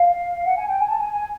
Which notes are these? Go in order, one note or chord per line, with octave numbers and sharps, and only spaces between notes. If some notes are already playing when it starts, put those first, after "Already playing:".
Already playing: F5
F#5
G#5
G5
G#5
A5
G#5
G#5